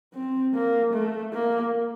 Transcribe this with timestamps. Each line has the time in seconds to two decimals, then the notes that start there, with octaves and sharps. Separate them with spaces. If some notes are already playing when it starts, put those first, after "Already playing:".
0.14 C4
0.55 A#3
0.94 A3
1.34 A#3